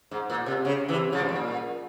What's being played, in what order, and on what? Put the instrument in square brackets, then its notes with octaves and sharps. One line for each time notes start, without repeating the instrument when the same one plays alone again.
[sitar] G#2
A#2
C3
C#3
C3 E3
C#3 F3
G2
G#2
A#2